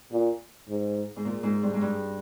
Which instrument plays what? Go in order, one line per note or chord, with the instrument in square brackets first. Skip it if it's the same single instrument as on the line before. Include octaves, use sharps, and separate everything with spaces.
[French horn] A#2
G#2
[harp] G#2
A#2
G#2
G2
G#2
G2